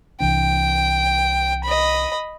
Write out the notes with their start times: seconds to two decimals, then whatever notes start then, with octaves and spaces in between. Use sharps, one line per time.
0.21 C2 E3 D4 G5
1.64 D#5 B5